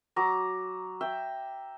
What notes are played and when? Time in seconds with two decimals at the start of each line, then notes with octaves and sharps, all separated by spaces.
0.16 F#3 A#5 D6
1.01 E5 G5